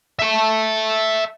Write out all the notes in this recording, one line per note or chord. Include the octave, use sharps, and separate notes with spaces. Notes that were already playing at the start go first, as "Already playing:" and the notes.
E5 A5